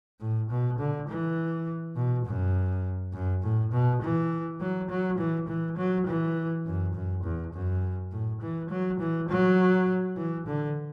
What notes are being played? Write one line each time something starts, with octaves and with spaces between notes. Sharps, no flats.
A2
B2
D3
E3
B2
F#2
F#2
A2
B2
E3
F#3
F#3
E3
E3
F#3
E3
F#2
F#2
E2
F#2
A2
E3
F#3
E3
F#3
E3
D3